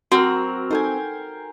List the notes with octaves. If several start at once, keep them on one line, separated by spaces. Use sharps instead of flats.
F#3 C4 F#4 A#4
D#4 A4 C5 G5 G#5